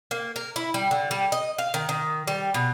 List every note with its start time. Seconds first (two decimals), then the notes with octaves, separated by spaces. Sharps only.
0.11 A#3
0.36 A#4
0.56 E4
0.74 G3
0.91 D3
1.11 G3
1.32 D#5
1.58 F5
1.74 D#3
1.89 D#3
2.27 G3
2.54 B2